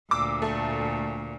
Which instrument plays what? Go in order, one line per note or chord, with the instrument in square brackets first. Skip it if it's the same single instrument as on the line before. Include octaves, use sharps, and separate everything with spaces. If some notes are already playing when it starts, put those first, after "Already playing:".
[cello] D2 A#2 [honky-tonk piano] D6 E6
[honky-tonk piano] A3